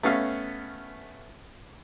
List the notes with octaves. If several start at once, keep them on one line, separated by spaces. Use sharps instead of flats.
A3 B3 C#4 F5